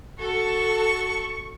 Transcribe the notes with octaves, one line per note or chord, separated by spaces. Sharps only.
F#4 A4 C#6